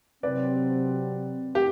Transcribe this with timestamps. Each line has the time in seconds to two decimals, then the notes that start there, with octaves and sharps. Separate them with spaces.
0.23 C3 F#3 C4 B4 D5
1.55 G4